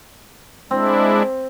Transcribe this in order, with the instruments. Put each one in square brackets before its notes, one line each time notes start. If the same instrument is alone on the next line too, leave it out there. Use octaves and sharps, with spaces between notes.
[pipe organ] G#3 D4 E4 [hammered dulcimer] C4